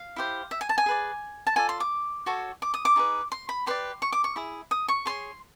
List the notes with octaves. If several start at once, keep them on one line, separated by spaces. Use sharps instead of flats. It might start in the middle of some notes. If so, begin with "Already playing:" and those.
Already playing: F5
E4 G4 C5
E5
G#5
A5
G#5
G#4 B4 D5
A5
F4 A4 D5 G#5
C6
D6
F#4 A4 C#5
D6
D#6
D6
D#4 G#4 B4
C6
B5
G4 B4 D5 C6
C#6
D6
C#6
E4 G#4
D#6
C#6
G#4 C#5 C6